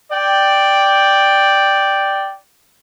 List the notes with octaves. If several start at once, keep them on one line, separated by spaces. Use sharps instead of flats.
D5 G5